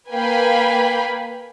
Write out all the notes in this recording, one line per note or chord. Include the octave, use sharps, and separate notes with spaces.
A#3 B4 F5 G5 G#5 B5